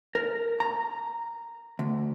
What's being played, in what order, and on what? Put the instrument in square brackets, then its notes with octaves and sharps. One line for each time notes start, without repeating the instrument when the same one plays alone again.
[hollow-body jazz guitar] A#4
A#5
D2